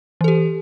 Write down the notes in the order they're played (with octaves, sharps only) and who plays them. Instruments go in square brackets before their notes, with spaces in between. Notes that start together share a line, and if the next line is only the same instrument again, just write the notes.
[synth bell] E3
A4
G4